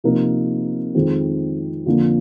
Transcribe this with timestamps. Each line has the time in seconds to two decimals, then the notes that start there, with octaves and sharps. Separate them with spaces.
0.04 C3 F3 A#3 D#4 A#4
0.95 F2 D#3 G#3 C4
1.86 F2 D3 F3 A#3